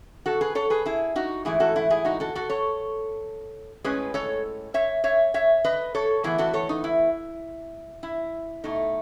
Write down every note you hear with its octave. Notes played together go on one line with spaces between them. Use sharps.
F#4 A4
G#4 B4
A4 C#5
G#4 B4
E4 G#4
D#4 F#4
G#2 E3 A3 E4 G#4
F#4 A4
E4
E4 G#4
D#4 F#4
F#4 A4
F#4 A4
A4 C#5
A2 G#3 C#4 G#4 B4
A4 C#5
C#5 E5
C#5 E5
C#5 E5
B4 D#5
A4 C#5
A2 E3 B3 E4 G#4
F#4 A4
A4 C#5
D#4
E4
E4
B2 A3 D#4